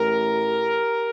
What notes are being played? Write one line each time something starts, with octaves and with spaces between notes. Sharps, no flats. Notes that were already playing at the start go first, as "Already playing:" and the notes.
Already playing: A1 A2 G4 A#4